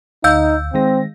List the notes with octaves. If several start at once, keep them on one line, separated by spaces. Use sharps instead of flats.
D2 D#4 F5 E6 G6
D#3 G#3 C4 A#6